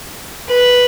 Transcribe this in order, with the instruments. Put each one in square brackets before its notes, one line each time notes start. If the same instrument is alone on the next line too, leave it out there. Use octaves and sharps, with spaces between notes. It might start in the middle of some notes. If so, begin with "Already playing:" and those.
[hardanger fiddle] B4